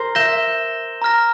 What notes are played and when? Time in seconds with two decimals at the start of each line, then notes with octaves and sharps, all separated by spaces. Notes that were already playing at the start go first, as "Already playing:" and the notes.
Already playing: A#4 C5
0.15 E5 G6 A#6 E7 G7
1.02 A#5 F6 A#6